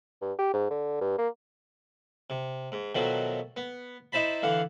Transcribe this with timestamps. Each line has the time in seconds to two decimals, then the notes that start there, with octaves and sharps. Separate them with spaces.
0.22 G2
0.39 G4
0.54 G#2
0.70 D3
1.01 G2
1.18 A#3
2.30 C3
2.72 G#2
2.95 B2 D#3 F3 F#3 A3
3.57 B3
4.12 D#4 E4 C5 A5 B5
4.42 D3 E3 F5 F#5